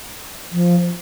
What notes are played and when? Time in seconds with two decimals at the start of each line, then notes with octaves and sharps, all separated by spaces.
0.52 F3